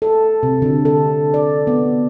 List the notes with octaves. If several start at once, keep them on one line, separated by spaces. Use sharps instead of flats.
A4
C3
D3
A4
D5
B3